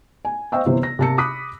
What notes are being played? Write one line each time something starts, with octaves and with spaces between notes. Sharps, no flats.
G#5
C5 D#5 F5 G5 C#6 E6
G1 C3 E3 C5
A#6
C3 A#3 A5 E6 C#7
B5 D6 D#6 F#6 B6